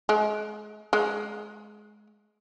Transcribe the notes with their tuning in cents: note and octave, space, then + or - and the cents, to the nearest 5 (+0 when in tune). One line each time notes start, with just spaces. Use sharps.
G#3 +30
G#3 +20